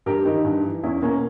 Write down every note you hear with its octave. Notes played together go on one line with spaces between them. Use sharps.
G2 G4 A#4
D#3 D#4 G4
G2
E3
E2 C#4 E4
B2 A#3 C#4